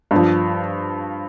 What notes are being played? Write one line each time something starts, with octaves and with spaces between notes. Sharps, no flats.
G2
F3